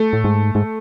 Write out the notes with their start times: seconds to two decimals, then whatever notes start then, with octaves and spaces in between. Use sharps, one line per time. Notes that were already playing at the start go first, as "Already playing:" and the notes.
Already playing: A3
0.13 A2
0.24 G#2
0.55 G#2